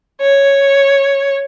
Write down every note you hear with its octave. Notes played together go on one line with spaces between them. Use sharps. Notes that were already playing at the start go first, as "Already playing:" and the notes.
C#5